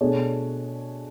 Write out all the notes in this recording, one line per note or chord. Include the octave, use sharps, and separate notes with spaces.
B2 A3 D4 G#4 C#5